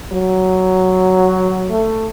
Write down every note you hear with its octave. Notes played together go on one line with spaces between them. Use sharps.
F#3
A3